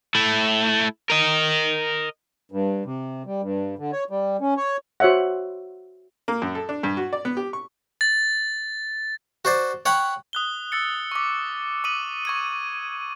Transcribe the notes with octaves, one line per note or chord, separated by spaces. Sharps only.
A3 E4
A#4 D#5
G2
C3
G3
G2
D3
C#5
G3
C#4
C#5
F#4 C5 C#5 E5 F#5
A#3
F#2
A4
D4
G2
F#4
D5
B3
G4
C#6
A6
F#4 C5 D5
C#5 F#5 G5 B5
D#6 F#6 G7
E6 A6 C#7
C#6 D6
D6 D#6 D#7 F#7
C#6 G#6 D#7